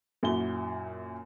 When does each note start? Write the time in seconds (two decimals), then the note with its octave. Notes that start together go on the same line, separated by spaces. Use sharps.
0.23 F#2 A#2 E4 F#4 G7